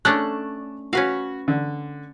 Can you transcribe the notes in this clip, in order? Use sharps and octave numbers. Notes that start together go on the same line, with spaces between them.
A3 C#4 D4 A5 D6 F#6
C#4 F#4 B4 F5
D3